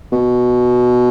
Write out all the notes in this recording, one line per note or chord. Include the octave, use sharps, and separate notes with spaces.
B2